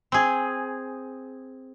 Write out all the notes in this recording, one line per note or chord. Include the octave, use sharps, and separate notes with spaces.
C4 G#4